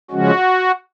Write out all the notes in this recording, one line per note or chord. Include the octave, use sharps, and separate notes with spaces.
C#3 F3 G#3 C#4 F#4